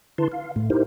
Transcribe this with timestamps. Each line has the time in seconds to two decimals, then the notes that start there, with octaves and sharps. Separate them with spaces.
0.18 D3 E4 B4 A5 C6
0.32 F5
0.56 A2 A3
0.70 D#4 E4 G4 A#4 C5